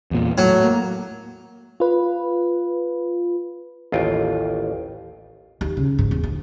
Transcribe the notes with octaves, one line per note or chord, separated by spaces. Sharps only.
E2 A#2
A2 F#3
A#3
F4 B4
A1 D#2 F4 G5
D#2
C#3
G#2
E2
D2